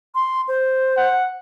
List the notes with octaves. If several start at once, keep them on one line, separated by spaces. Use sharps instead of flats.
C6
C5
F#5